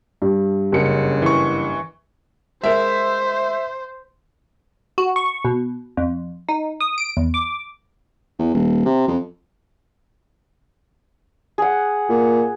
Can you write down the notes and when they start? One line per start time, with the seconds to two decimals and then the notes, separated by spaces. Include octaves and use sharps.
0.22 G2
0.72 F#1 C#3 C#7
1.22 E3 C#6
2.63 G#3 A#4 C5 E5
4.98 F#4
5.16 C#6
5.45 B2
5.97 F2
6.49 D#4
6.81 D#6
6.98 D7
7.17 E2
7.34 D6
8.39 E2
8.54 D#1
8.85 C3
9.08 F2
11.58 G#4 F#5
12.09 A#2